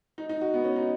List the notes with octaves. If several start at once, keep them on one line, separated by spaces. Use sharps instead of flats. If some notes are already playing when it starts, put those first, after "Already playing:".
D#4
D#4
F#4
B3
C#4
D#4